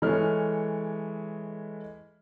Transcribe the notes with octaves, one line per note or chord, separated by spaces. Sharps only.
E3 G#3 A3 C#5 F6